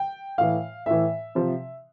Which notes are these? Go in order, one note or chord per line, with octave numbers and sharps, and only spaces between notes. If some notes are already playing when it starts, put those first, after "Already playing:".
Already playing: G5
A2 E3 F5
A2 E3 E5
C3 F3